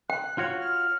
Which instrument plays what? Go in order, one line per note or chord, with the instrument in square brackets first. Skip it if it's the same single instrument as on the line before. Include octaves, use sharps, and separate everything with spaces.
[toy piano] G5 [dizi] F#6
[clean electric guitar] F4 F#4 C#5 [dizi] G#6
[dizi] F6